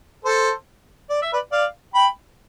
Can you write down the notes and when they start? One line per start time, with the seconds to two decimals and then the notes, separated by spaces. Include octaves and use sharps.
0.25 A4 C5
1.10 D5
1.22 E5
1.33 B4 D5
1.51 D5 F5
1.94 G5 B5